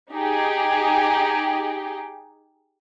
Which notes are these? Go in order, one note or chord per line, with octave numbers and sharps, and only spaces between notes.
D#4 G4 G#4